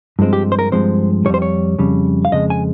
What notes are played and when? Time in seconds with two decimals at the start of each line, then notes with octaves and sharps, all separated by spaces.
0.19 G2 F3 G#3 C4
0.33 G4
0.52 C5
0.59 A#4
0.72 G2 F3 G#3 C4 C5
1.26 F2 C#3 G3 C#5
1.34 C5
1.42 C#5
1.79 F2 C#3 G3
2.25 F5
2.32 F2 C#3 G#3 D#5
2.50 G#5